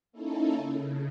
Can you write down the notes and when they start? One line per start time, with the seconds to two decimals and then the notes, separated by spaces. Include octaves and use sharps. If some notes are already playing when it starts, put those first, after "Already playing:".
0.12 A#3 C#4 D#4 E4 A4
0.54 C#3